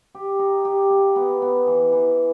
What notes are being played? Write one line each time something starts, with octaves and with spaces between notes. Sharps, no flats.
G4
D#4
G4
A#3
B3
B3
E3
E3